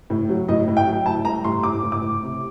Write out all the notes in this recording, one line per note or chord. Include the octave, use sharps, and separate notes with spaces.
A2
F#3
A2 D#5
A2
G5
F#3
A2 A5
G3 A#5
A2 C6
A2 D6
A2
D6
A2
C3